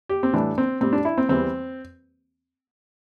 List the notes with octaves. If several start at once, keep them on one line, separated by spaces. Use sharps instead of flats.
G4
C4
A2 E3 G3 D4
C4
A2 G3 C4
D4
E4
C4
E2 E3 G3 C4